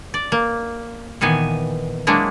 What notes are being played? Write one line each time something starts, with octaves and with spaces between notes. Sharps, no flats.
D5
A#3
A#2 D#3 E3 B3 G#5
F#3 G#3 A#3 D4 E4